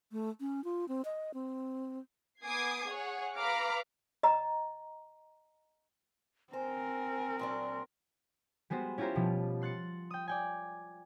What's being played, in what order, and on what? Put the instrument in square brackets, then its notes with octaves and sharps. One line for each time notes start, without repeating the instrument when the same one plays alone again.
[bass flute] A3
C#4
F4
C4
D#5
C4
[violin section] B3 G#5 D6 D#6 G#6 C7
G#4 C#5 F#5
B4 F5 A#5 B5 D6 F6
[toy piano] D#5 A#5
[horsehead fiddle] C4 A#4 [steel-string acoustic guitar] C5 [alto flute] G#5
[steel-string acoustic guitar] A#2 F#3 D4 [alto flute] C6
[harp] G3 G#3 B3 F#4 C5
C#4 E4 F4 G4 A#4 C5
B2 F3 G3
C6 F#6 A6 C#7
G5 D#6
D5 G5 G#5